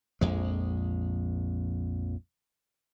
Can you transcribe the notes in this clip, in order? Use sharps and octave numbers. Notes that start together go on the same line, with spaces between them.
A#1 F2 G#3